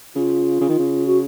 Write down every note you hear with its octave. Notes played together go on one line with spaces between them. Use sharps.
C#3 F4
C#3
D#3
C#3
F#4